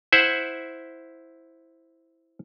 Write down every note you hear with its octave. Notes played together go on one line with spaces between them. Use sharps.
E4 C5 E5 F#5